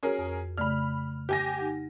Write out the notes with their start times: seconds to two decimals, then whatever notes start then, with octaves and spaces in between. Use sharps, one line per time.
0.03 C#4 F#4 G#4 A#4
0.18 F2
0.58 C#3 A3 D5 B5 F6
1.29 G4 G#5 A#6
1.58 D#4 F#5